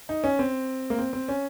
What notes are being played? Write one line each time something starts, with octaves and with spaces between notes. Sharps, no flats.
D#4
C#4
C4
A#3
C4
C4
C#4